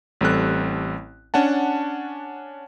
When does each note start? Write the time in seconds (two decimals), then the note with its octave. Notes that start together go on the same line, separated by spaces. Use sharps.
0.21 A1 G3 C4 A4 F#6
1.34 C#4 D4 F#5 A5